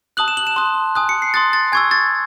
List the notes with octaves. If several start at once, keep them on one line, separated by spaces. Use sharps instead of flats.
A5 D#6 F#6 F#7
E7
F#7
E7
A5 C6 D#6 F#6
G#5 D#6 F#6
C#7
C7
C6 D#6 F#6 A6
A6
G#5 C#6 E6 G#6
A6